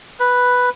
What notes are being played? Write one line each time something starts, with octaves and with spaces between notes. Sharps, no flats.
B4